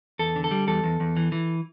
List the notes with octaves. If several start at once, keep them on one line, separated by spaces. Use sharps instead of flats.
E2 A4
D3
A4
G3
E2 A4
E2
E2
E3
E3